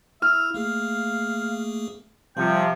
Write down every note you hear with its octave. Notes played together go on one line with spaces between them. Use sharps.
E4 E5 F6
A3 A#3 G#4 F5
C3 F3 G3 G5 C#7